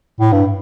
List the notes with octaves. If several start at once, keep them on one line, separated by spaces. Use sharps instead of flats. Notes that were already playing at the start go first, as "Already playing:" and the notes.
A2
G2